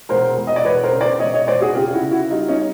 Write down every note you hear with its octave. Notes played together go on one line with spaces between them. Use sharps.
E1 A#4 C5
E1
D#5
D5
E1 B4 C#5
A#4 C5
C#3
C5 D5
E1 C#5 D#5
C#5 D#5
E1 C5 D5
F#4 G#4
C#3 F4 G4
E4 F#4
C#3
E4 F#4
G3 D#4 F4
C#4 D#4